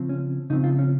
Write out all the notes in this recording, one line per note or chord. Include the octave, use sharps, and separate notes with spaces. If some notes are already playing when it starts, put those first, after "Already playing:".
Already playing: C#3 F3 C4
C#4
C#3 F3 C4 D#4
F4
C#4